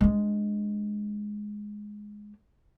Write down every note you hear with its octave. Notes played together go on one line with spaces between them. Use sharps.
G#3 D4